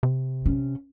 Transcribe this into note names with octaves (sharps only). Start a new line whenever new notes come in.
C3
C#4